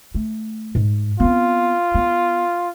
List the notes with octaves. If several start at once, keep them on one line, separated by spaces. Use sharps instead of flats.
A3
G#2
B3 C4 F4
B3